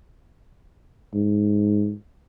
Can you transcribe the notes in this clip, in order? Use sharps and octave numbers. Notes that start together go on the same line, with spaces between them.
G#2